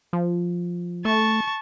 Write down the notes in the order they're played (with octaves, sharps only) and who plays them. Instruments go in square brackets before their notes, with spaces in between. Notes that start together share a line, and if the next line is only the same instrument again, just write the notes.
[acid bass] F3
[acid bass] A3 [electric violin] A5 C#6